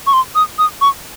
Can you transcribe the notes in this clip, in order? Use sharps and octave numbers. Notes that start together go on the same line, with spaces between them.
C#6
C6
D#6
D#6
C#6